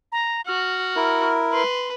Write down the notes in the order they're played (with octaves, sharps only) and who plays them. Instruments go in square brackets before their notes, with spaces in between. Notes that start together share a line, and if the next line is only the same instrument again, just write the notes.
[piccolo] A#5
[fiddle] F#4 [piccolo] F6
[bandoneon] E4 A#4
[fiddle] B4 [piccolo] C6